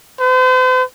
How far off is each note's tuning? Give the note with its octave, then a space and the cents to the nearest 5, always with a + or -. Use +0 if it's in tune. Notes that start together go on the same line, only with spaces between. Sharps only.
C5 -45